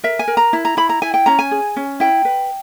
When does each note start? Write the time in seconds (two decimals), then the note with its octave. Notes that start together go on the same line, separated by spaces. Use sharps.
0.04 A#4 E5
0.19 G#5
0.28 A#4
0.37 A#5
0.53 E4
0.65 A#5
0.77 E4 B5
0.89 A#5
1.02 E4 G#5
1.14 G5
1.26 C#4 A#5
1.39 G#5
1.51 G#4
1.76 C#4
2.00 E4 G5
2.25 B4